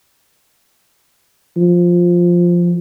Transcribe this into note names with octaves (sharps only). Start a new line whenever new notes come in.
F3